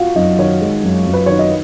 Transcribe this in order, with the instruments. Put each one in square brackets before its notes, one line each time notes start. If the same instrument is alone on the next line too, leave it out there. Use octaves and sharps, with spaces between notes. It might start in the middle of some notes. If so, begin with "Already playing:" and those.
Already playing: [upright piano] F4 F#4 F5 F#5
[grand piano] F#2 [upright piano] D#4 D#5
[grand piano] D#3 [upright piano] C#5
[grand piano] G#3
F#2
F#2
[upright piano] B4
[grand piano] D#3 [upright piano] C#5
[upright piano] D#5